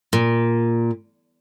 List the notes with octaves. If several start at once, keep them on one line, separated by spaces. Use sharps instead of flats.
A#2